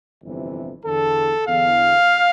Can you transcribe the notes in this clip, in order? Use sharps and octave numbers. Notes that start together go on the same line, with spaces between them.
G1 F2 C3 E3
E2 D3 A4
E2 D3 F5